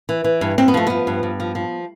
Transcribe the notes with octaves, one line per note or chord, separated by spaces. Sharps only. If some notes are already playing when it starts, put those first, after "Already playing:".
E3
E3
G2
G2 C4
B3
F3 A3
F3 B3
G2
G2
F3
F3